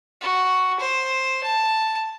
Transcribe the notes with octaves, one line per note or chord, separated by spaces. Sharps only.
F#4
C5
A5